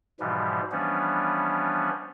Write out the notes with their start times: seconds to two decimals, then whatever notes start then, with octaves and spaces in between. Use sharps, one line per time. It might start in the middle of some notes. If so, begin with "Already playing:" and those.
0.20 G#2 B2 E3 F3 G3
0.72 E3 F3 G3 B3 C#4 D4